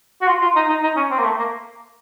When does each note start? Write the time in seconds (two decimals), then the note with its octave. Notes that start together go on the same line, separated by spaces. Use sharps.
0.21 F#4
0.27 F4
0.41 F4
0.56 D#4
0.69 D#4
0.83 D#4
0.96 C#4
1.11 C4
1.19 A#3
1.24 A3
1.39 A#3